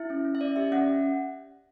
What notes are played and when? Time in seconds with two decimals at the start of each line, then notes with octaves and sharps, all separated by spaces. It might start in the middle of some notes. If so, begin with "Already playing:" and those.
Already playing: E4 E5
0.10 C#4
0.25 C#4
0.35 E5
0.41 C#4 D5
0.56 G4 E5
0.72 C#4 F#5